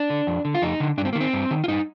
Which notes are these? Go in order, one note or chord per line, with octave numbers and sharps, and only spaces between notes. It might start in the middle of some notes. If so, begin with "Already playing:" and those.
Already playing: D4
D3
F2
D3
F4
F2 D#4
D3
G2 D4
C4
A#3
D#3
C4
G2
D#3
F4
G2 D#4